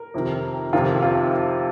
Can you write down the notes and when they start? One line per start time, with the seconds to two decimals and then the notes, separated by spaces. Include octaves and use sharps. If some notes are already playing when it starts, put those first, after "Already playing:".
Already playing: A#4
0.14 F2 C3 D#3
0.73 F2 C3 D#3 F4
1.03 F4